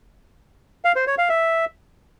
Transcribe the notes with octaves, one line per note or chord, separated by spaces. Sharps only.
F5
C5
C#5
F5
E5